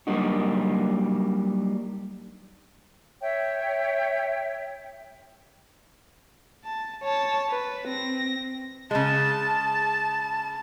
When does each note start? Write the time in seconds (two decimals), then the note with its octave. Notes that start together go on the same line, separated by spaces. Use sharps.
0.07 F#3 G3 A#3 D4 D#4 F#4
3.21 C#5 E5 G5
6.64 A5
7.04 C#5 A5
7.50 B4
7.88 C4 A#6
8.91 C#3 G#3 A5